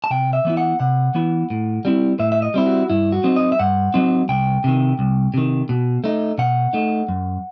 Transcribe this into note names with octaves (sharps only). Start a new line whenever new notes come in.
A5
C3 G5
E5
E3 B3 E4
F#5
C3 F#5
E3 B3 E4
A2
G3 C4 E4
A2 E5
E5
D#5
G3 C4 E4
F#4
G2 E4
F#4
F#3 C4 D#4
D#5
E5
G2 F#5
F#3 C4 D#4
C2 G5
C3 D#3
C2
C3 D#3
B2
A3 D#4
B2 F#5
A3 D#4
F#2